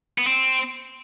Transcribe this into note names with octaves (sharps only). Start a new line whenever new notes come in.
B3
C4